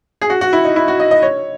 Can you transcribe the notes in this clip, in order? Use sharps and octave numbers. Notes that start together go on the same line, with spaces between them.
G#4
F#4
F#4
E4
D#4
E4
F#4
D#5
D#5
C#5